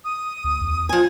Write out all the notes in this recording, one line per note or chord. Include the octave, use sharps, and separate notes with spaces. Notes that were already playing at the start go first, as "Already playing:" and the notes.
D#6
D2
E2
F3 G#5 G#6